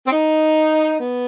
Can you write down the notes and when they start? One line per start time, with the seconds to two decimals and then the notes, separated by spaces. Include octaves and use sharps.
0.05 C4
0.11 D#4
0.99 B3